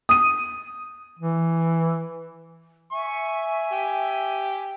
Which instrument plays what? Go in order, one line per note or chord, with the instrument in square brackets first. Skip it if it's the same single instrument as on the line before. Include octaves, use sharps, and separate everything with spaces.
[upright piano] D#6 D#7
[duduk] E3
[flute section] E5 G#5 [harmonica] C#6
[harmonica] G4